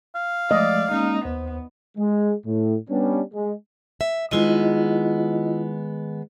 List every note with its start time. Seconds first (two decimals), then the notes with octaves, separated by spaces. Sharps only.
0.15 F5
0.51 F3 G#3 A3 D5 D#5
0.92 G#3 A#3 C#4 D#4
1.25 D#2 B3 C5
1.98 G#3
2.46 A2
2.89 G3 B3 C#4 D4
3.33 G#3
4.01 E5
4.31 D#3 G#3 B3 E4 F4 D#5